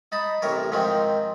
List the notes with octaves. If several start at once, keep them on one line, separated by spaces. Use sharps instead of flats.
D#4 A5 B5
A1 C3 A#4 C#5
G#2 D#3 F3 C4 D#4